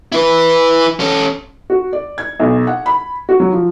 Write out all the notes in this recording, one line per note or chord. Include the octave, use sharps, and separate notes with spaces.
E4 B4
C#4 A4
F#4
D5
G#6
B1
F#5
B5
F#4
F#3
F3